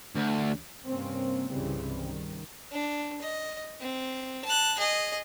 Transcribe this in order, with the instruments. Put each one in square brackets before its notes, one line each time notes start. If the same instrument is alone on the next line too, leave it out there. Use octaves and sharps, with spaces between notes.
[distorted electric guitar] D2
[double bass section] G2 C3 A#3 C4 C#4
C2 G2 C#3 E3 G3 C4
D#3
[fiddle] D4
D#5
C4
A5 F#6
G#4 D#5